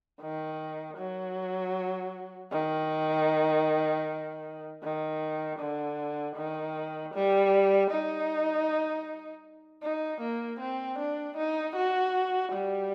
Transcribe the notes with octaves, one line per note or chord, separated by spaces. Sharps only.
D#3
F#3
D#3
D#3
D3
D#3
G3
D#4
D#4
A#3
C4
D4
D#4
F#4
G3